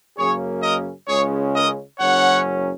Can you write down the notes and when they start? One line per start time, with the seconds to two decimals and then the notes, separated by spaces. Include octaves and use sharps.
0.16 F#2 C#3 A#3 C#4 G#4 C#5
0.62 A#4 D#5
1.07 C#2 C#3 G#3 C#4 G#4 C#5
1.53 A#4 D#5
1.99 F#1 F#2 F#3 C#4 C#5 F#5